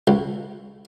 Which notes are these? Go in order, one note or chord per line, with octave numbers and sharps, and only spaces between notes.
C#2